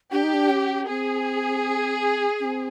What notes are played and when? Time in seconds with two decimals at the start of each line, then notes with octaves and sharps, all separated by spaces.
0.12 D4 G4
0.23 D#4
0.34 D4
0.50 C#4
0.88 C4 G#4
2.40 C#4
2.44 C4